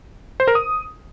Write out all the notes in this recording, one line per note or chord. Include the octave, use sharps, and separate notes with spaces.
C5
A#4
D#6